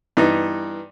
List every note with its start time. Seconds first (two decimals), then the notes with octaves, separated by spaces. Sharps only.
0.17 G2 E3 B3 D#4